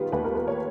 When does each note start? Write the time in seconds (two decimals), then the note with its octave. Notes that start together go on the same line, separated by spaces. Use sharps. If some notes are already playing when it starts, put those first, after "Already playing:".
Already playing: D#3 G3 B3 F4
0.12 D#2 B4
0.24 A#4
0.35 B4
0.48 C#5